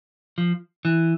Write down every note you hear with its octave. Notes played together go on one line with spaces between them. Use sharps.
F3
E3